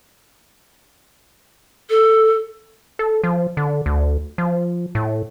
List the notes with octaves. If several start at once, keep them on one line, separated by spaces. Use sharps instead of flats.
A4
A4
F3
D3
D2
F3
A2